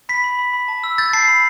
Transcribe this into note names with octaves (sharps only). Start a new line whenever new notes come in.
B5 B6
B5
B5
B5
A5
E6
G6 A6
A5 C7
B5